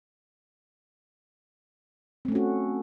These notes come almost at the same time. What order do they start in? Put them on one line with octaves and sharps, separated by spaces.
C4 A3 C#4 F#4